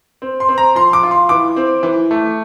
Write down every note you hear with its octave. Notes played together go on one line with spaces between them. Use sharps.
C4
C6
C4
A#5
F3 C6
D6
F4
C6
E3 D6
C4
E3
A3